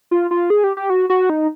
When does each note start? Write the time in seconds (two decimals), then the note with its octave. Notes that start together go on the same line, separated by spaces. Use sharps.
0.11 F4
0.31 F4
0.50 G#4
0.64 G4
0.77 G4
0.90 F#4
1.10 F#4
1.30 D#4